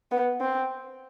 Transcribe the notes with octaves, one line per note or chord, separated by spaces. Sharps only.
B3
C4